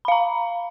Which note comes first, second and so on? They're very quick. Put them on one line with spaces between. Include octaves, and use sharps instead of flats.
B5 F5 A#5